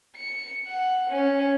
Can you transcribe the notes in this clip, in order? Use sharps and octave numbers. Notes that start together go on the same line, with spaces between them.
C#7
F#5
C#4